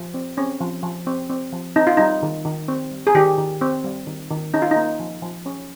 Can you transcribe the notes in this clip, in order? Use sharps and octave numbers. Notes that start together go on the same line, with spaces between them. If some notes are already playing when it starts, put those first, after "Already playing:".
Already playing: F3
C4
C4 C#4
F3
F3
C4
C4
F3
C4 D#4
F4
G3 D#4
D#3
D#3
C4
G3
G#4
D#3 G4
D#3
C4
G3
D#3
D#3
C#4 D#4
F4
D#4
A#3
F3
F3
C#4